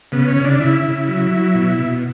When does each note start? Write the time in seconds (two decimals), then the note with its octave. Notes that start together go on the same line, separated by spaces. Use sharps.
0.12 C#3 B3
0.28 C#4
0.36 C#3
0.44 D4
0.60 C#3 E4
0.83 C#3
1.08 F#3
1.31 F#3
1.55 B2
1.79 B2